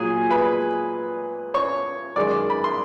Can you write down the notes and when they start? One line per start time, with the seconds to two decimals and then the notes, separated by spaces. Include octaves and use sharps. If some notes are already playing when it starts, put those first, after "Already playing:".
Already playing: A#2 F#3 G#4 G#5
0.30 B4 B5
1.54 C#5 C#6
2.16 F#2 D#3 G#3 D5 D6
2.50 B5
2.64 C6